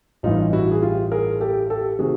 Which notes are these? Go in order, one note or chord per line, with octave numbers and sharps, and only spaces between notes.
A1 G2 E3 D#4 F4
E4 F#4
G#4
F4 G4
G#4 A#4
G4 A4
G4 A4
C3 D#3 F#4 G#4